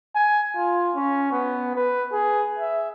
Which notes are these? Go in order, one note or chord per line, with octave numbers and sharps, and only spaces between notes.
G#5
F4
C#4
B3
B4
G#4
E5